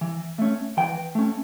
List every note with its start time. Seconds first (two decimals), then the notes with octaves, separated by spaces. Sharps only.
0.01 E3
0.39 A3 C#4
0.77 E3 G5
1.15 A3 C#4